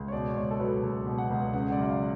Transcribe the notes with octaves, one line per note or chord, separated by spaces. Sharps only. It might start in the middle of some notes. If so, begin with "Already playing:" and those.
Already playing: C#2
C#5
B2 D5
C#2 C#5
A4
F#3 B4
C#2
B2
F#5
C#2
C#3 F#5
D5
F#2
F5